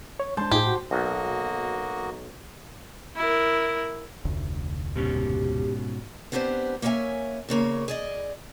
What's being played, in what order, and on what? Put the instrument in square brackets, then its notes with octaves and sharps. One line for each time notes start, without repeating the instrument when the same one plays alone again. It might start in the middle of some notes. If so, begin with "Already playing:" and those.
[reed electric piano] C#5
[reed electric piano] G#3 D4 [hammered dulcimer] C5 A5 C6
[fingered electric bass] A2 [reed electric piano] D#4 F4 G#4 [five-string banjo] G4
[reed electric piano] F#4
[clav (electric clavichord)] B1 [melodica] A#3 F#4 D#5
[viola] E4 A#4
[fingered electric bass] F1 D2
[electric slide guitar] G#2 B2 C#4 [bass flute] G4
[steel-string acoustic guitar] B3 C4 D4 G4 B4 C5
A#3 B3 C#4 C#5 E5 G#5
E2 C#3 A#3 C#5
G#4 D5 D#5